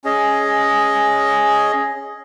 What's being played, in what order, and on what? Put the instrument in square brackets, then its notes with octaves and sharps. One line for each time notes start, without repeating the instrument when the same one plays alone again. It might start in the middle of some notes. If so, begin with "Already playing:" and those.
[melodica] C#4 G#4 D#5